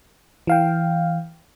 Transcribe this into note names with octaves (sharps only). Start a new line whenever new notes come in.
E3 F5 G5